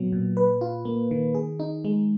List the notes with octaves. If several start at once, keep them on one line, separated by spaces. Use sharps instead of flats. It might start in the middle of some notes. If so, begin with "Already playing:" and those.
Already playing: A#2 F#3 B3
A#2
B4
F4
A#3
D#3
G#4
D#4
G#3